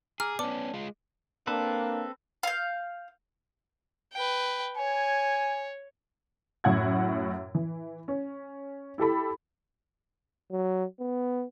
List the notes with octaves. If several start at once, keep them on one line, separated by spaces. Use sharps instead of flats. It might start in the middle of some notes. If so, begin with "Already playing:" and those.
G#4 A#5 D6 E6 F6
B3 C#4 D5 A5 D6
G#3 F4
A#3 C4 D4 A4 B4
F5 G6
B4 G5
C#5 G#5
F#2 A2 F#5 G#6
E3
C#4
E4 G4 A4 B5
F#3
B3